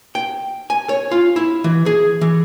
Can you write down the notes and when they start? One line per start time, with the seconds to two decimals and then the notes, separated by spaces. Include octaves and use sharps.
0.15 G5
0.70 G#5
0.89 C#5
1.11 F4
1.36 E4
1.64 E3
1.86 G#4
2.21 E3